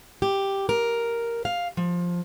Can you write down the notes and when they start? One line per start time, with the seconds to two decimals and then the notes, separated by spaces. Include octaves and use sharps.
0.22 G4
0.69 A#4
1.45 F5
1.77 F3